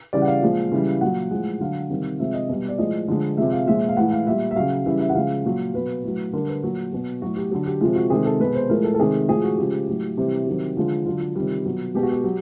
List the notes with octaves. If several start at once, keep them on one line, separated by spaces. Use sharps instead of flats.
C#3 E3 G3 D5
F#5
F5
A#2 F3 G#3
C#3 E3 G3
A#2 F#3 F#5
A2 F3 G#3
D3 F#3 F5
C3 D#3 G3
C3 F3 G#3 E5
D#5
B2 G3
D5
A2 F3 G#3 D#5
D3 F3 G#3
C3 F3 G#3 E5
F5
A#2 F3 G#3 E5
F5
A2 E3 G#3 F#5
F5
A#2 G3 E5
E5
C#3 F#3 F5
C#3 E3 G3 E5
E5
F#5
C#3 F3 G#3 F5
A#2 F#3
B2 F#3 B4
A2 F#3
D3 G3 A#4
B4
A#2 F#3 F#4
B2 F#3
A2 F#3 F#4
G4
D3 F#3
G4
C3 F3 G#3 F4
F#4
C3 D#3 G#3 G#4
A4
B2 G#3 B4
C5
A2 F3 G#3 A#4
A4
A4
C3 D#3 G#3 G#4
A2 F3 G#3 G#4
F#4
C#3 F3 G#3 G4
A2 F#3
C3 E3 G3 G4
C3 D#3 F#3
D3 F3 G#3 F4
D3 F#3 F4
F4
C3 D#3 G3
B2 F#3
B2 G#3 G4
F#4
G4
F#3